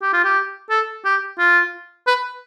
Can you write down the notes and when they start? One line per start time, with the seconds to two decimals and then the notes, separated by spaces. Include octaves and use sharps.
0.02 G4
0.13 F4
0.24 G4
0.70 A4
1.05 G4
1.39 F4
2.07 B4